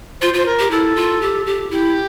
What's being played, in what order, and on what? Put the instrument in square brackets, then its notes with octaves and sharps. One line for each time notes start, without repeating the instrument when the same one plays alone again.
[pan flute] F4 [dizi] C5
[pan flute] F4 [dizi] C5
[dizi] A#4
[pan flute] G4
[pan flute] E4 [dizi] A4
[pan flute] F4
G4
G4
[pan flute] E4 [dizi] G4